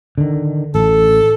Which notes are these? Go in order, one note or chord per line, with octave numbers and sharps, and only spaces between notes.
D3 D#3
A1 A4